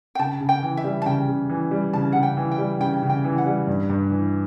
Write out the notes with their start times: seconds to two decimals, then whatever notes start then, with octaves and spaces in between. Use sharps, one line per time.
0.15 G5
0.19 C#3 A5
0.41 C#3
0.49 G5
0.63 E3
0.77 E5
0.84 G3
1.02 A5
1.06 C#3 G5
1.28 C#3
1.49 E3
1.71 G3
1.93 C#3 A5
2.12 C#3 F#5
2.23 G5
2.37 E3
2.52 G5
2.58 G3
2.80 C#3 G5
3.02 C#3
3.10 G5
3.24 E3
3.38 F#5
3.46 G3
3.67 G2
3.90 G2
4.11 E3